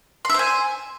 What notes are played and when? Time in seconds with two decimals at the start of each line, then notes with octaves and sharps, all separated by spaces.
0.25 C6
0.30 E5
0.34 C5
0.39 G#5